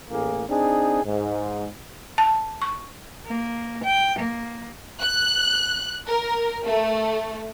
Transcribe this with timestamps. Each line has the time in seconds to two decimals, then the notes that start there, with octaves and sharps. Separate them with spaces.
0.10 A1 A2 A#3 G#4
0.49 C4 D4 D#4 G#4
1.04 G#2
2.18 A5
2.62 C#6
3.26 A#3
3.84 G5
4.19 A#3
5.01 F#6
6.06 A#4
6.66 A3